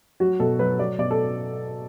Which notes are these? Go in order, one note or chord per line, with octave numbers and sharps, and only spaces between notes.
F#3 F#4
B2 A4
F#3 B4
F#3 D5
B2 D5
A4